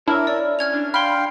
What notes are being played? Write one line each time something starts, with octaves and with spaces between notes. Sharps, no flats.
D4 E4 A#4 C#5 E5
D5
C#4 F6 G#6 F7
D4
F5 G5 B5 C6 F6